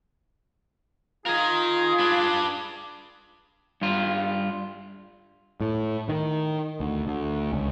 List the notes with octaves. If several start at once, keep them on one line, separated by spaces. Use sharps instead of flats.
F4 G#4 A#4 D#5
D4 B4
G2 F4
A2
D#3
D2
D2
C#2